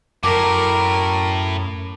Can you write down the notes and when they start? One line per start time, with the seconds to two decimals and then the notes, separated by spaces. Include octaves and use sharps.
0.23 F#2 A2 A#4 D6